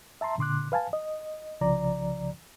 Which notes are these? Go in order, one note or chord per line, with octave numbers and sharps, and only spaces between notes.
E5 A5 A#5 C6
A#2 D3 C6 D6 F#6
B4 F5 G#5 A5
D#5
C2 C#3 F3 D5 A#5